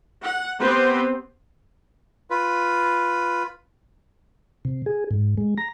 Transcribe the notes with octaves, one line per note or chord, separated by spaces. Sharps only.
F#5
B3 C4 G4 B4 C5
F4 B4
C3
G#4
G#2
G#3
A#5